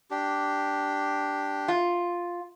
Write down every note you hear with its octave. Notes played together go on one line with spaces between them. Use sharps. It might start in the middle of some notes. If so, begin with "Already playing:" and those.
D4 G4
F4